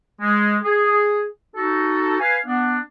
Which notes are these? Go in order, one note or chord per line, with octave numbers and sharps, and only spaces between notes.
G#3
G#4
D#4 F#4 A4
B4 F5 G#5
B3 D4